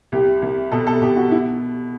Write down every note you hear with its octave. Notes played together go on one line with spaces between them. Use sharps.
C2 G4
C2
B2 A4
A4
B2 G4
F#4
E4